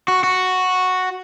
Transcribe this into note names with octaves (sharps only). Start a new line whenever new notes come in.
F#4
F#4